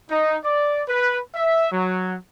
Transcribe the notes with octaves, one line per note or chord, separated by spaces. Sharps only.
D#4
D5
B4
E5
F#3